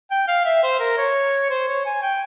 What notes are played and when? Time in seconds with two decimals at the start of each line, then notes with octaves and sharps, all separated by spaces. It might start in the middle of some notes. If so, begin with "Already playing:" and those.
0.11 G5
0.28 F5
0.45 E5
0.63 C5
0.80 A#4
0.98 C#5
1.50 C5
1.68 C#5
1.86 G#5
2.02 G5